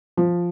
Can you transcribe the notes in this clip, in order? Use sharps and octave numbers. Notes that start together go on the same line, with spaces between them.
F3